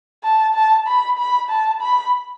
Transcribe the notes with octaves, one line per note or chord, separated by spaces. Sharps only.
A5
A5
B5
B5
A5
B5